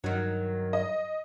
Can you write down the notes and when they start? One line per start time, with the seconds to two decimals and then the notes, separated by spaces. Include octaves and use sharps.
0.04 G2 D#3 F#3
0.73 D#5